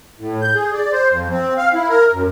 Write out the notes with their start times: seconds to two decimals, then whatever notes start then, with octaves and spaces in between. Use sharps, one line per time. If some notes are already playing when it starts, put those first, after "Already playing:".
0.19 A2
0.41 G6
0.55 G#4
0.73 D5
0.92 C5
1.11 F2
1.31 C4
1.57 F5
1.74 E4
1.89 A#4
2.12 F#2